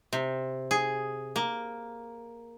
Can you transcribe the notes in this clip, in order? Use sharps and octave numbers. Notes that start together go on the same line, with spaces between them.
C3
G#4
A#3